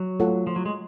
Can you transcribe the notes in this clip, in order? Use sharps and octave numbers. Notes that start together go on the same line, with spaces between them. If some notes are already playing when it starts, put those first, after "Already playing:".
Already playing: F#3
A3 F4 A4 C#5 F#5
F3
F#3
G#3